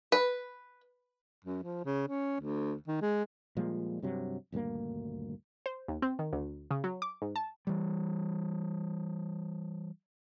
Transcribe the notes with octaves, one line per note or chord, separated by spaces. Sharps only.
B4
F#2
F3
C#3
C#4
D2
D#3
G#3
A#2 F3 G3 G#3
G2 C3 F#3
D#1 D2 G2 A#3
C5
D#2
C4
D#3
D2
C#3
F#3
D6
G#2
A5
E3 G3